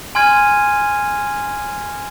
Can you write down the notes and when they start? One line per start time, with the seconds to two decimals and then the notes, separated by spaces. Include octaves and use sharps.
0.15 G#5 C6 F6 G#6 D#7